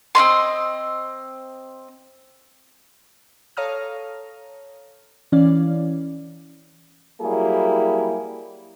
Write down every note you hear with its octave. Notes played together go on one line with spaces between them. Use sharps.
C4 C#4 D#5 C6
A4 C#5 F5 A#5 D#6 F6
E3 C#4 D5 F5
F#3 G3 A#3 E4 G4 G#4